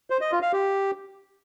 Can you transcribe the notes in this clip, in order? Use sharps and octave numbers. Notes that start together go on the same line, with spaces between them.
C5
D#5
F4
F5
G4